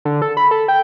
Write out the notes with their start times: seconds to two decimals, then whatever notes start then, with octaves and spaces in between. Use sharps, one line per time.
0.05 D3
0.22 A4
0.37 B5
0.51 A4
0.68 G5